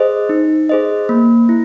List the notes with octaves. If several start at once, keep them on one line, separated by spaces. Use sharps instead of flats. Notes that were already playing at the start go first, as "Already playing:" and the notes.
Already playing: G#4 C5 D#5
D#4
G#4 C5 D#5
A#3
E4